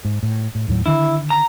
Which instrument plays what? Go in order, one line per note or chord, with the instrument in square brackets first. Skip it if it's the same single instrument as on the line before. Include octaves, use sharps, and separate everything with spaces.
[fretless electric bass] G#2
A2
A2
D#2 A2 F#3
[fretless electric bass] D3 D#3 D4 [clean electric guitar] E4
[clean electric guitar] A#5